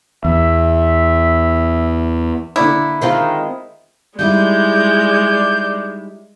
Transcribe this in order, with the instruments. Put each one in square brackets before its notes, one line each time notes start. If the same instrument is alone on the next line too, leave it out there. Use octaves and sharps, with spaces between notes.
[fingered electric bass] E2 [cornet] E5
[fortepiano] D3 A#3 D5 [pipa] E4
[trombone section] D#3 [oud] G#3 C4 F4
[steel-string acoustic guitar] G3 D#4 E4 [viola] G#3 [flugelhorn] D5 [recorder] G6